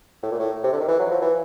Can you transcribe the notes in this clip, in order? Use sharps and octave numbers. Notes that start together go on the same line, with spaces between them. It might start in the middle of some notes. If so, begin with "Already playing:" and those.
A2
A#2
A2
C3
D3
D#3
E3
F#3
F3
E3